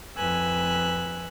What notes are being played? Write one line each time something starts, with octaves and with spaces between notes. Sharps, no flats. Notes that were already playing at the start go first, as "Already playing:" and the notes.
F2 B4 G#5 E6 F#6